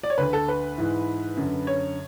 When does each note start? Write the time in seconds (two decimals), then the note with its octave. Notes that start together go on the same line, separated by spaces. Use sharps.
0.03 D5
0.10 C#5
0.18 D2 D3 B4
0.33 A4
0.48 B4
0.78 G#2 E3
1.37 F#2 D3
1.67 C#5